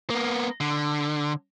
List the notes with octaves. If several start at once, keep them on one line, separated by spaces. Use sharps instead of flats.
A#3 B3
D3